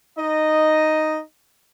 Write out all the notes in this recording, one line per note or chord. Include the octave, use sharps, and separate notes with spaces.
D#4 D#5